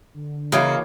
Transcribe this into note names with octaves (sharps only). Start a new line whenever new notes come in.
D3
C#3 E3 A#3 F#4 A#4 C#5 D#5 F5